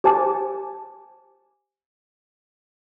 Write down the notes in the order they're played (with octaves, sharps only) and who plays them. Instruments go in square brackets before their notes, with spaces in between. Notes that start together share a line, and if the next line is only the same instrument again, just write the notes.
[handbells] G4 C5 G#5 A5 D6